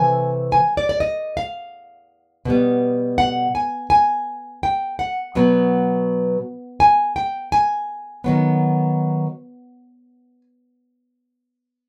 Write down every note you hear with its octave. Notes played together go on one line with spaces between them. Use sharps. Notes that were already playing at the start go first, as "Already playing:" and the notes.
Already playing: C3 E3 A3 G#5
G#5
D5
D5
D#5
F5
B2 G3 B3
F#5
G#5
G#5
G5
F#5
B2 F#3 B3
G#5
G5
G#5
D#3 F#3 B3